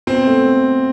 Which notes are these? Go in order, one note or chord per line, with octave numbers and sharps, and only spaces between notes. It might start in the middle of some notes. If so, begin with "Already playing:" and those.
B2 C4
A3